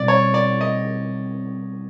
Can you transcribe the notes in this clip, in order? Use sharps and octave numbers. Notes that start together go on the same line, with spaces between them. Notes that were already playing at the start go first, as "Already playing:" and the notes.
Already playing: B2 G3 C4 D5
C#5
D5
D#5